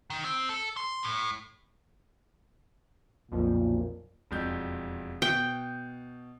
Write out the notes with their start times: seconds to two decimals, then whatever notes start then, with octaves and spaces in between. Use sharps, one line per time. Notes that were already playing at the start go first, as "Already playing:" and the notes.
0.10 D#3
0.24 C4
0.49 A4
0.77 C6
1.03 A2
3.31 B1 F2 A#2 F3
4.31 E1 F2 G6
5.22 B2 G5